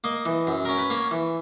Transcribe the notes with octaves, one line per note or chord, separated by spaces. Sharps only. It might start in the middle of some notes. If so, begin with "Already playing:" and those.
A#3 D#5
E3
F#2
C#4 A#4
B4
A#3 C#5
E3